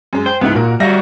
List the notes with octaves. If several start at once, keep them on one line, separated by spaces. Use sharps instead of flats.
F#2 G#3
C5 G5
C#2 G#2 B3 E4
A#2 F#4 A#4
G3 F#4 E5 F5 A#6